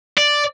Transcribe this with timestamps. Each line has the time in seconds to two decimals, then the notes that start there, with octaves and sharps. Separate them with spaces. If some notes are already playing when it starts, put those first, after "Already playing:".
0.18 D5